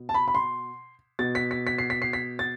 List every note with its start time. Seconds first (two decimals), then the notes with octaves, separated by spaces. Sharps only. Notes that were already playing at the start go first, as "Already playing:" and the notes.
Already playing: B2
0.09 A5
0.14 B5
0.28 B5
0.35 C6
1.19 B2 A6
1.35 B6
1.51 B6
1.67 B6
1.78 C7
1.90 B6
2.02 C7
2.13 B6
2.39 A6